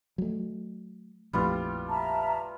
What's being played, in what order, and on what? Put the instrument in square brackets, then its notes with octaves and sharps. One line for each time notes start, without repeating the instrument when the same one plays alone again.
[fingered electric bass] F#3 A3
[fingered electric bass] A#1 F2 A2 [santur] G3 B3 F4
[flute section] E5 A5 A#5